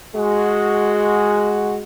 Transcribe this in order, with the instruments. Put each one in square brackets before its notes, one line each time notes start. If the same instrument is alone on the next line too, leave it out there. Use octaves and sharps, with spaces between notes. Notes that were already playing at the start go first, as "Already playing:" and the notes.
[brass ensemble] G#3 F#4